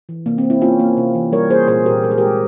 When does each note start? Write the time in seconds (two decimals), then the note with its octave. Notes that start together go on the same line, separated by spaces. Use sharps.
0.09 E3
0.26 C3 A#3
0.38 C4
0.44 A#3
0.50 C4 E4
0.62 A#3 C#4 F4
0.79 A#3
0.97 C3
1.15 E3
1.32 G3 A#4 C#5
1.50 A#3 G#4 C5
1.68 A#2 G#4 C5
1.86 A#2 G4 A#4
2.04 G#3 A#4
2.11 G#4
2.18 G#3 G4 A#4